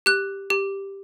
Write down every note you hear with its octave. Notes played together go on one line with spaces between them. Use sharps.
G4 F#6
G4